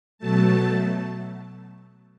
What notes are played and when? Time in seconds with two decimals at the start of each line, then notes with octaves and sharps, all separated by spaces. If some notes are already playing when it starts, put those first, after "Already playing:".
0.18 B2 F#3 A3 A5